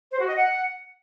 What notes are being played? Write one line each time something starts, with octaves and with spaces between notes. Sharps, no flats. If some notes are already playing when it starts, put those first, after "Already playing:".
C5
F#4
D#5
F#5